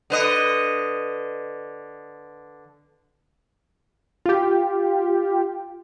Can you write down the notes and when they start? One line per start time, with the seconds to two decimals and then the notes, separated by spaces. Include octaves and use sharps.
0.10 D3 B4 D#5
4.26 F4 G4